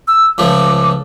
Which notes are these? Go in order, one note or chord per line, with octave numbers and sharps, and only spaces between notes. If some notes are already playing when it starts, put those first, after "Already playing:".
E6
C#2 F3 A3 D6